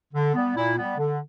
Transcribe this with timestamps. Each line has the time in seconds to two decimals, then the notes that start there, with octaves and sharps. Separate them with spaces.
0.13 D3
0.35 G3 B3
0.56 A#2 E4
0.77 G3 B3
0.98 D3